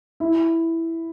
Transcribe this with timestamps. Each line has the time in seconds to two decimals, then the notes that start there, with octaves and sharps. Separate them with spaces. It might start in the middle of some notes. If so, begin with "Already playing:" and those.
0.20 E4